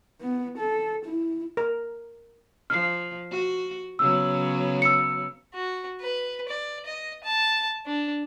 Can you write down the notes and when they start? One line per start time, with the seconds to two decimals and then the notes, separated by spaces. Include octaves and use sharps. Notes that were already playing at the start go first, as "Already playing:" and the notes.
0.21 B3
0.58 A4
1.05 E4
1.57 A#4
2.70 F3 F6 C7
3.31 F#4
3.99 C#3 F#3 B3 E6
4.82 E6 C#7
5.55 F#4
6.00 B4
6.48 D5
6.86 D#5
7.23 A5
7.86 D4